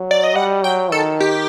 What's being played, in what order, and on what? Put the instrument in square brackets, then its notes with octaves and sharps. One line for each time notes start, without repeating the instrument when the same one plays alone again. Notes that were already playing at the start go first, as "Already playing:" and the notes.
Already playing: [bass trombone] F#3
[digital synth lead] D5
D#5
[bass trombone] G3 [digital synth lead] F#5
[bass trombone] F#3 [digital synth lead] G5
[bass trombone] D#3 [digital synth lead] A4
[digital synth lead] G4